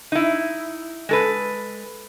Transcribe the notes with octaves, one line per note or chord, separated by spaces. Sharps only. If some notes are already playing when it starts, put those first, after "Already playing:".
D#4 E4
G#3 A4 B4